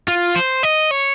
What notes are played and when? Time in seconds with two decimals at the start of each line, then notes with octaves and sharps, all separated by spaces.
0.08 F4
0.36 C5
0.63 D#5
0.91 C#5